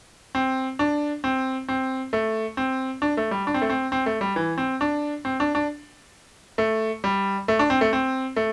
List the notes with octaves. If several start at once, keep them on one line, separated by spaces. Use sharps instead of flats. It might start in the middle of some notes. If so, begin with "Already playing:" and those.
C4
D4
C4
C4
A3
C4
D4
A3
G3
D4
C4
A3
C4
C4
A3
G3
E3
C4
D4
C4
D4
D4
A3
G3
A3
D4
C4
A3
C4
A3